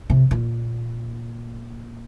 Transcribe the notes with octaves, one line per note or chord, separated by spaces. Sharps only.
C3
A#2